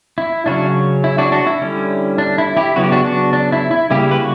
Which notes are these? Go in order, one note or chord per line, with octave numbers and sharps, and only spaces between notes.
E4
C#3 F#3 C#4 D4 F#4
E4
D4 F#4
D4 F#4
E4
D3 G3 C#4
D4
E4
E4 G4
C#3 F#3 B3 F#4
G4
D4 F#4
D4 F#4
D4
E4
E4
C#3 G3 A#3 E4 G4
B4
F#4